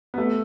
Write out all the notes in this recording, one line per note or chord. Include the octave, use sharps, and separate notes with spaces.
B3
A3